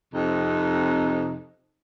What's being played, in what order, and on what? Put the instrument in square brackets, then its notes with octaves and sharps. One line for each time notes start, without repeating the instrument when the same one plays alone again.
[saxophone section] F2 C3 D#4